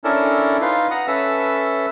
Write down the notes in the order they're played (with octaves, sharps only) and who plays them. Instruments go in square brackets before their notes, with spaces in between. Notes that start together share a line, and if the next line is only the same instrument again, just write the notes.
[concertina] C#4 D4 E4 A4 A#4
D#4 F4 B4 F5
F#5 A#5 D#6
C#4 A4 B4 E5